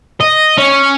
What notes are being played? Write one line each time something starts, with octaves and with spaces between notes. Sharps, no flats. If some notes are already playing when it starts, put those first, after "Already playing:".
D#5
C#4